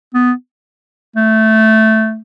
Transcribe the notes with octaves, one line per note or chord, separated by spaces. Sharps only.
B3
A3